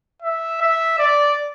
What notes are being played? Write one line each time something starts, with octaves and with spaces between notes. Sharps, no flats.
E5
E5
D5